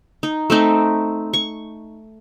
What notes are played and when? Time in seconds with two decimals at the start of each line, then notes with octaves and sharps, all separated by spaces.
0.23 D#4
0.50 A3 C4 D#4
1.33 C#6